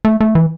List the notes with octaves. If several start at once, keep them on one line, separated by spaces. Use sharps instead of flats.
A3
A3
E3